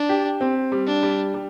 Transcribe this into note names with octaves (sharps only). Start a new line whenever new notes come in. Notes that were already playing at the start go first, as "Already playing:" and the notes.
Already playing: D4
G4
C4
G3
D4
G3
G3